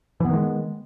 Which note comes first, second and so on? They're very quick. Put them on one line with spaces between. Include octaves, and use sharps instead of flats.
E3 B3 D#3 G#3